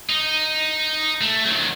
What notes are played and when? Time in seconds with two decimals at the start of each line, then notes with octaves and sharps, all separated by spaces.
0.09 D#4
1.21 A3
1.46 D#3 F#3